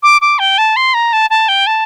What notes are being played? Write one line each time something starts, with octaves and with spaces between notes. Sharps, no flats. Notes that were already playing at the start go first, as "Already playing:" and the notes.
D6
D6
G5
A5
C6
A#5
A5
A5
G5
A5